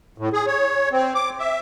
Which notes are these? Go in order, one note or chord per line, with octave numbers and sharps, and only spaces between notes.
A2
G#4
C#5
C4
D6
E5